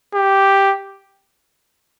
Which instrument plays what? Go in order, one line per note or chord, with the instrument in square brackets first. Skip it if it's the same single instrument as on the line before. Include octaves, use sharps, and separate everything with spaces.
[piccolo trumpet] G4